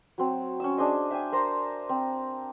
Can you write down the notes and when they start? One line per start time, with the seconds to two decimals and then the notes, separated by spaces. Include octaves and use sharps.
0.18 F#3 C4
0.60 C#4 C#6 E6
0.77 D4 G#4 C5 D#5
1.11 E5 G5 G#5
1.32 A#4 C5 A#5 C6
1.89 C4